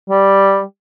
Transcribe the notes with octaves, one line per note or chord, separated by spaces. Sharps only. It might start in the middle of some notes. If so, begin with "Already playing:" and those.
G3